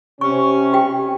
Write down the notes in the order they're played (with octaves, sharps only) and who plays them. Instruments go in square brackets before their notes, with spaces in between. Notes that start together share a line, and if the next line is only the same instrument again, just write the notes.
[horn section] C3 C#4 [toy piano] C#6
[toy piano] G4 G5